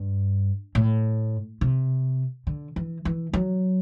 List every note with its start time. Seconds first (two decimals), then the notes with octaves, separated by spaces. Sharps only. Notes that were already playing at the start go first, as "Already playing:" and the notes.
Already playing: G2
0.75 A2
1.61 C3
2.47 D3
2.76 E3
3.05 E3
3.33 F#3